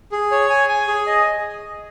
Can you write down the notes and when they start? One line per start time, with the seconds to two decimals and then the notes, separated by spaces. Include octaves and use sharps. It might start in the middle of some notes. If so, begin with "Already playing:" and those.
0.12 G#4
0.31 C#5
0.50 G#5
0.69 G#5
0.87 G#4
1.07 D#5